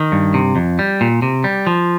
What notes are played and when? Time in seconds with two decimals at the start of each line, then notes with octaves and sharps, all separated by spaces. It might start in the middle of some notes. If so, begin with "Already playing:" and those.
Already playing: D#3
0.12 G2
0.34 C3
0.56 F2
0.79 G3
1.01 A#2
1.22 C3
1.44 G3
1.67 F3